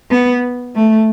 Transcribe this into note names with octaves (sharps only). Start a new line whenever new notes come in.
B3
A3